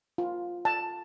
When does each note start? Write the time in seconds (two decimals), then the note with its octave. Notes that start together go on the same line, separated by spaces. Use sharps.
0.18 F4
0.65 A5